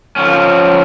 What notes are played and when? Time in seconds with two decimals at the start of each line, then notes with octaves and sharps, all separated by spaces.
0.16 F3 C#4